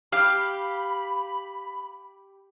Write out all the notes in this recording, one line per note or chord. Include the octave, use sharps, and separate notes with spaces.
G4 F5 B5